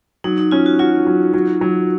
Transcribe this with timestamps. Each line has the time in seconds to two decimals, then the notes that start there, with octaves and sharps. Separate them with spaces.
0.24 F#3 D#4
0.38 D#4
0.51 C#4 F4
0.66 F#4
0.79 F4 F#4
1.07 F#3
1.34 F#3
1.61 F#3